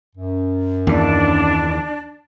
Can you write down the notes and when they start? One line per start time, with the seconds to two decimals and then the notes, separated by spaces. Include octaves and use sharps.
0.16 F#2
0.87 D#2 E3 D4